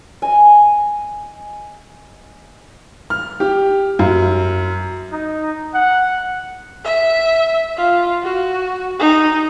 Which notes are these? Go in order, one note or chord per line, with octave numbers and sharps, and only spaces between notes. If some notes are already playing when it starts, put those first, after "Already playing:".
D#5 G#5
F6
G4
F#2
D#4
F#5
E5
F4
F#4
D#4